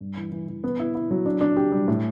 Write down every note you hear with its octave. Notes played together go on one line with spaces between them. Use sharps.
G2
E3
E3
E3
B3
E4
E4
F#3
D4
D4
G4
G3
A2